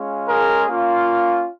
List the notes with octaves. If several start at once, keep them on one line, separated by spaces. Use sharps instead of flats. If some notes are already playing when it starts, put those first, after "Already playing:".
Already playing: G#3 C#4 F4
G#4 A#4
A#3 C#4 F4